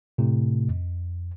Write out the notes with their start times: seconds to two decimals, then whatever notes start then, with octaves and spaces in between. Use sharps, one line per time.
0.18 A2 C3 A3
0.69 F2